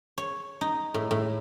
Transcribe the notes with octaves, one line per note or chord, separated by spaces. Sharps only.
C#5
D#4
A2
A2